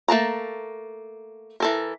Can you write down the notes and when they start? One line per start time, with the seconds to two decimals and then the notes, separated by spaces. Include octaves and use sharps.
0.08 A3 A#3 A5 A#5
1.60 E3 A4 A#4